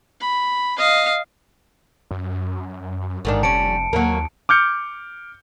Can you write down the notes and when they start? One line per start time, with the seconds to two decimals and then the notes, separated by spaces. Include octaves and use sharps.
0.20 B5
0.78 D#5 F5
2.11 F#2
3.25 A1 G#2 D#3 D4
3.43 F1 G3 C#4 A5 C#7 D7
3.93 D#2 F#3 A#3
4.49 D6 F6 G6 C#7